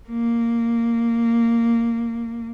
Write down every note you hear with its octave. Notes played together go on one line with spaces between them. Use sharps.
A#3